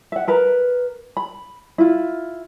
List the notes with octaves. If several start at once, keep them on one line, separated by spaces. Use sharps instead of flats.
E5 F#5
A#4 B4 A#5
B5
E4 F4